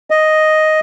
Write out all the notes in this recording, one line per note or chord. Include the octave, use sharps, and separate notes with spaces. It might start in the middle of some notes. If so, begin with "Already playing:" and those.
D#5